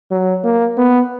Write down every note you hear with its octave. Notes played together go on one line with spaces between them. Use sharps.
F#3
A#3
B3